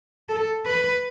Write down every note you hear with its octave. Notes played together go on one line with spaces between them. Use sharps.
A4
B4